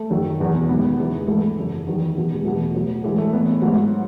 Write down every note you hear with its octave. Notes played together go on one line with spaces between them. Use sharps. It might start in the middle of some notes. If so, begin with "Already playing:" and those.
Already playing: A3
F#2 D#3 F#3
E2 B2 F#3
B3
G#2 D#3 F#3 B3
E2 C#3 E3
G#3
G#2 E3 A3
F#2 C#3 E3
E2 D#3 F#3
E2 B2 F#3
G#3
E2 B2 F#3 A3
A2 F#3
A2 E3 G#3
A3
A2 E3 B3
G#2 F#3